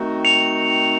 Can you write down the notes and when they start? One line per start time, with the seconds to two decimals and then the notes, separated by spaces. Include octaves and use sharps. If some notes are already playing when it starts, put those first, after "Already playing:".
Already playing: D#3 A3 C4 D#4 F#4
0.25 C#7 F7